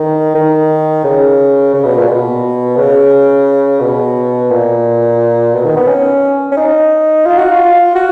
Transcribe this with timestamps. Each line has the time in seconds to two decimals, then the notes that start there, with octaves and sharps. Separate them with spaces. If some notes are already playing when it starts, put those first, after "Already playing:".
Already playing: D#3
0.35 D#3
1.04 C#3
1.74 C#3
1.84 B2
1.97 A#2
2.08 B2
2.77 C#3
3.80 B2
4.50 A#2
5.53 B2
5.65 D#3
5.76 B3
5.88 C#4
6.52 C#4
6.57 D#4
7.26 F4
7.38 F#4
7.51 F4
7.95 F#4